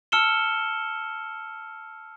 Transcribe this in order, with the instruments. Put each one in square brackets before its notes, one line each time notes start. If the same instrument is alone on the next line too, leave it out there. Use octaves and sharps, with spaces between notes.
[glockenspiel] A5 E6 F6 C#7 E7 G7